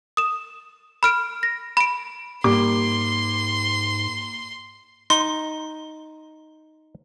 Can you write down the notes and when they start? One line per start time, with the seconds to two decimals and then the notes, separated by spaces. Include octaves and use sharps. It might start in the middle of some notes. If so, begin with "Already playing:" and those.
0.17 D#6 E7
1.03 B5 F6 D7
1.43 A#6
1.77 B5 D7
2.44 G#2 G3 A#3 C6 D6
5.10 D#4 C6